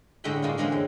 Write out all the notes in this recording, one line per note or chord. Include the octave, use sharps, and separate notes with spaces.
A2 D3 G#3 D#5 G5 B5
A2 G#3 A#3 D4 F4
D3 E3 G#3 A#3 C4 C#4
F#2 G5